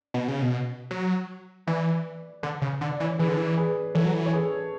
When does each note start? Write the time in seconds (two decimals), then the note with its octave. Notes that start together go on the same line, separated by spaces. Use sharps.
0.14 B2
0.28 C#3
0.42 B2
0.91 F#3
1.67 E3 B4 D5
2.43 D3
2.62 C#3
2.81 D3
2.91 D5
3.00 E3
3.04 C#5
3.19 E3 G#4 B4
3.28 D3
3.37 E3
3.57 G#4 B4
3.95 E3 A4 C#5
4.05 F#3
4.14 E3
4.26 C#5
4.33 G#4 B4